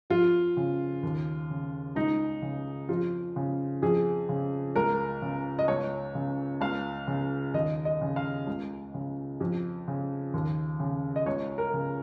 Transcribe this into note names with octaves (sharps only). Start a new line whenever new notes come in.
F2 F4
C#3
D#2
C#3
C#2 D#4
C#3
F2 F4
C#3
F2 G#4
C#3
C#2 A#4
C#3
D#5
C#2 C#5
C#3
C#2 F5
C#3
D#2 D#5
D#5
C#3
F5
C#2
C#3
F2
C#3
D#2
C#3
D#5
C#2 C#5
A#4
C#3